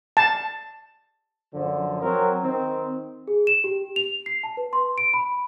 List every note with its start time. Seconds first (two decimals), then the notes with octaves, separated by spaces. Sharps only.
0.17 A5
1.54 F#2 D3 F3
2.02 F#3 C4 A#4
2.42 D#3 C4
3.28 G#4
3.47 E7
3.64 G4
3.96 F7
4.26 C7
4.43 A5
4.57 B4
4.73 C6
4.98 D7
5.14 B5